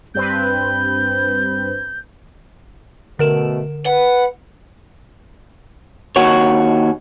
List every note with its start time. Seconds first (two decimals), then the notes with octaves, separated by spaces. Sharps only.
0.15 G2 C4 B4 G6
3.19 B2 D3 A3 A#4 E7
3.86 B4 F#5
6.16 D#2 F#4 C#5